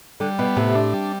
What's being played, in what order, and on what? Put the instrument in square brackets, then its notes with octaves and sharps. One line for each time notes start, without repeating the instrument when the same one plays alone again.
[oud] D3 [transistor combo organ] G3
[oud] B2 [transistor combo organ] B3
[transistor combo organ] A2 [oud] C3
[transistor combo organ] D4
G3